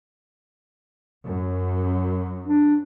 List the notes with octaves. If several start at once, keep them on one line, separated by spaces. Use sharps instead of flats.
F#2
D4